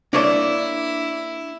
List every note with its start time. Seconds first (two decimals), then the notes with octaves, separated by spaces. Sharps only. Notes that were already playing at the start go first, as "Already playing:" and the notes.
0.13 A#3 D4 E4 C#5 D5